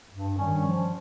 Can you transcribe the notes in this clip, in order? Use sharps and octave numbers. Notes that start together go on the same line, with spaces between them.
G2
D#3 G3 C#4
F3